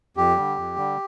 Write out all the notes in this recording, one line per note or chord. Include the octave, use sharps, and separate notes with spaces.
F2 G4
D3 G3
F2
D3 G3